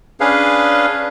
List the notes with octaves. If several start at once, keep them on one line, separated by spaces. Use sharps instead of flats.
C#4 D4 G#4 B4 F5